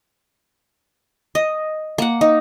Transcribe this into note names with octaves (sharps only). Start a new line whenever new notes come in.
D#5
A#3 F#5
D#4